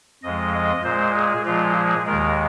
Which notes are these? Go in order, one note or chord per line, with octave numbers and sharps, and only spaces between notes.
F2 F3 G#3 D#5
D#5
A#2 G#3 C5
G#4
A#2 F3 G#3 F4
G#4
D#2 D#3 G#3 A#4